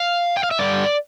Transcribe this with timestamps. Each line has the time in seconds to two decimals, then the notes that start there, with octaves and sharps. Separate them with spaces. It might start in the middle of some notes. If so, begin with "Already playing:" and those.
Already playing: F5
0.37 G5
0.43 F5
0.51 E5
0.59 G2 D3 G3 D5